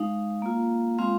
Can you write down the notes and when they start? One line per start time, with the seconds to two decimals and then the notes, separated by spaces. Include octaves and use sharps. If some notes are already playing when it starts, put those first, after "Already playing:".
Already playing: G#3 D#4 F5
0.42 A#3 F4
0.98 G#3 C4 F4 F5